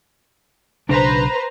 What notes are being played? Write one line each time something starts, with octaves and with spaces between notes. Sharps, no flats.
B1 C#3 D4 B4 C5 A#5